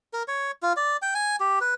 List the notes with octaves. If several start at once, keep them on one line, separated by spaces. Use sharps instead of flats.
A#4
C#5
F4
D5
G5
G#5
G4
B4